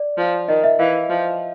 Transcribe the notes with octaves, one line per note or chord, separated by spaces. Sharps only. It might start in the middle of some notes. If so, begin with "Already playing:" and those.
Already playing: D5
F3
D#3 D#5
E5
E3 F5
F3